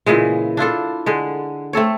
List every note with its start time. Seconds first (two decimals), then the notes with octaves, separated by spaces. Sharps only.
0.06 A#2 C#3 E3 G#3
0.57 D4 E4 F4 A4
1.06 D3 G#3
1.73 A3 C4 A4 C#5